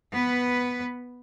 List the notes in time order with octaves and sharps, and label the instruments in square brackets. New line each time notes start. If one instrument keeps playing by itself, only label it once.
[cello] B3 B4